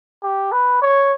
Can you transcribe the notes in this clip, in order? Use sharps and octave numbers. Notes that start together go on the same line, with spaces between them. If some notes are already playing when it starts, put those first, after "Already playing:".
G4
B4
C#5